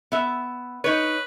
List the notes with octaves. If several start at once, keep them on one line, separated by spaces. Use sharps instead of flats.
B3 E5
D#4 B4 C#5